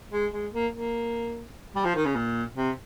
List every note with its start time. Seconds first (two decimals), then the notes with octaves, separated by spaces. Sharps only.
0.12 G#3
0.32 G#3
0.53 A#3
0.73 A#3
1.75 G3
1.85 F3
1.95 D#3
2.05 C#3
2.15 A#2
2.56 C3